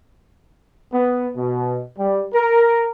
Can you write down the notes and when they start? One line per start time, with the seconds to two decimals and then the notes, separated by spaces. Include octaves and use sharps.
0.91 B3
1.35 B2
1.98 G3
2.34 A#4